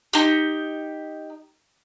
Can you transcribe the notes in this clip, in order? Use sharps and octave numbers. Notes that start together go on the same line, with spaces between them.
D#4 G4